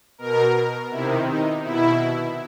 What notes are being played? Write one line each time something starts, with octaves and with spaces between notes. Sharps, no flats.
B2 A#4
C3 D#3 E4
D#4
B2 E4